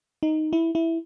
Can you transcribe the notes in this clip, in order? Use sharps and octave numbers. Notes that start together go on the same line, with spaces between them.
D#4
E4
E4